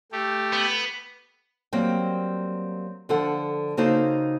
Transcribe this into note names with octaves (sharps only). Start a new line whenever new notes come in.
A3 G4
B3
F#3 G3 A#3 C4 G5
D3 F3 A4 F#5
C#3 A#3 D#4 F#4 A4 C5